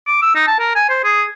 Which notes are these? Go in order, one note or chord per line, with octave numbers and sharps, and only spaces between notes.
D6
E6
D#4
A5
A#4
G#5
C5
G#4